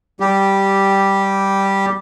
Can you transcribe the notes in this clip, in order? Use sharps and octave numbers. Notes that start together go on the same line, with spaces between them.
G3 G4